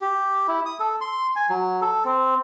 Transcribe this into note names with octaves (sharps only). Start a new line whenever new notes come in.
G4
E4
D#6
A4
C6
G#5
F#3
A4
C4